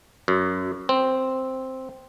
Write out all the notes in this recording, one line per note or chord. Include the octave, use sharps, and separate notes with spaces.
F#2
C4